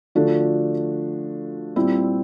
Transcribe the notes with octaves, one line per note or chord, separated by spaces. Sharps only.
D3 F3 A3 D4 F#4
A#2 G3 C4 E4